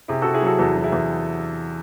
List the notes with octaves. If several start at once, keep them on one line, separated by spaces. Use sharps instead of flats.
C3 E4 G#4
F#4 A4
C3
E4 G#4
F#3 F#4 A4
E2 F#4 A4
F#3
E4 G#4
E2